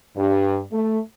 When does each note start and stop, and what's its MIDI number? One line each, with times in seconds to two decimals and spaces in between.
0.16 0.60 43
0.72 0.99 57